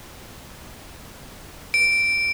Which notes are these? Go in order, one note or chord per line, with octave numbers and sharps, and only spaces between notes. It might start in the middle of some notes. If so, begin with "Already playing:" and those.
D7